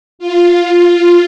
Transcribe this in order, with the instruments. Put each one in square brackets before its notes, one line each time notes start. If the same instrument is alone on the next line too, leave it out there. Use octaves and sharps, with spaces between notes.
[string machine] F4